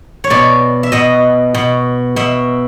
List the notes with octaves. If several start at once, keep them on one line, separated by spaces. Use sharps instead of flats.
C#5
B2 D5
E5
B2 D#5
B2
B2 E5